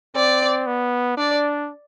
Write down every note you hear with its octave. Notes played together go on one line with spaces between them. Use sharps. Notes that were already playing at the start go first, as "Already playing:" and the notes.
C4 D5
B3
D4 D5